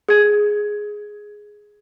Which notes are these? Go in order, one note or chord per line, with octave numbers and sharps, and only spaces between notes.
G#4 G#6